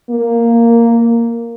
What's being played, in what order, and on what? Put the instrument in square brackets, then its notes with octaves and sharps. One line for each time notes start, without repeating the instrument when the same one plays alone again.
[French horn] A#3